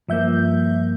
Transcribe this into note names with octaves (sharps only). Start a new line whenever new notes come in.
G2 F3 A#3 E5 G6